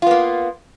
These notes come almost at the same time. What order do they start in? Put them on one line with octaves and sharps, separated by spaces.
F4 B3 A#3